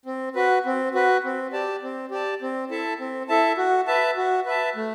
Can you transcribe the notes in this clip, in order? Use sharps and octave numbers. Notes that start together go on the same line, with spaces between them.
C4
F#4 B4
C4
F#4 B4
C4
G4 D5 A5
C4
G4 D5 A5
C4
E4 A4 E5 A5
C4
E4 A4 E5 A5
F#4
B4 E5 A5
F#4
B4 E5 A5
A3